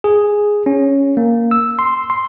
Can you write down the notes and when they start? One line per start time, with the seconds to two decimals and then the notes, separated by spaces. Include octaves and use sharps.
0.04 G#4
0.66 C#4
1.17 A#3
1.51 E6
1.79 C6
2.10 C6